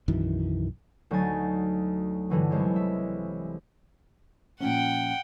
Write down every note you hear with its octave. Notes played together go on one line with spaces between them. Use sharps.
B1 F#2 D#3 E3
D2 F#3 D#4 G#5 A6
G2 D3 E3 F#3
C2 G#3 C#5
E5
A#2 F3 C#4 F#5 G5